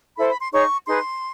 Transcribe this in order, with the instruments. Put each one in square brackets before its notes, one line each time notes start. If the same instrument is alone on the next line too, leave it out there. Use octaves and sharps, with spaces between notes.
[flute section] E4 A4 C5 B5
B5
C6
D#4 G#4 C#5 C#6
D#4 G#4 B4 C6